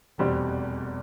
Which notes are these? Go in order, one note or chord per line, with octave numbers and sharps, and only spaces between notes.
F1 E2 B2 G3 C4